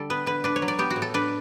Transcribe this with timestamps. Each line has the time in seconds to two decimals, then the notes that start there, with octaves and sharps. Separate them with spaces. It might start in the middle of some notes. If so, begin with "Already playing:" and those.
Already playing: D3 G3 A4
0.10 B3 B4
0.26 D3 B4
0.44 D4 B4
0.56 C#5
0.62 F#3
0.68 D5
0.79 B3 G4
0.90 F#4
0.96 A2
1.02 A4
1.14 D4 B4